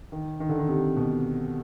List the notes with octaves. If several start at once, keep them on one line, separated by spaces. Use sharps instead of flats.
D#3
D#3
D3
D#3
C3
B2